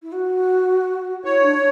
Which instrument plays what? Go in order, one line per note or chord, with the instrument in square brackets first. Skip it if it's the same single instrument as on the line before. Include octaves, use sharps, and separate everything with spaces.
[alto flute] E4
F#4
[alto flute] E4 [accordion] C#5
[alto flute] D4